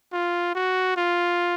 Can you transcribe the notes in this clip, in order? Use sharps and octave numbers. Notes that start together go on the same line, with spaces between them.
F4
F#4
F4